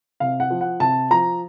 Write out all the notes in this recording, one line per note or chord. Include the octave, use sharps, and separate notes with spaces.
C3 F5
F#5
F3
F#5
C3 A5
F3 A#5